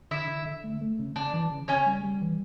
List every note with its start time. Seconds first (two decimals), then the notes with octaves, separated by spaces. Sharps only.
0.11 D3 E4 E5
0.28 D3
0.46 D3
0.64 A3
0.81 A3
0.99 C#3
1.16 C#3 D4 D5
1.34 E3
1.51 C#3
1.68 C#3 C#4 C#5
1.86 G3
2.04 G3
2.21 E3